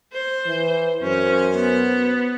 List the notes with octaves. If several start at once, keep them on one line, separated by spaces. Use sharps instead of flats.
C5
E3
F#2 C#4 C5
B3